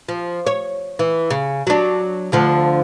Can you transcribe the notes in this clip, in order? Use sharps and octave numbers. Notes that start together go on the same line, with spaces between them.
F3
C#5
E3
C#3
F#3 D4
D2 D3 F3